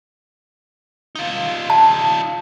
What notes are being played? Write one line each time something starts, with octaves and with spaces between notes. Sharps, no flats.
D#4 F4
A5